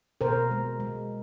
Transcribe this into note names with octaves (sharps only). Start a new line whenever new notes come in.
B2 A#4 C5
G#3
G#3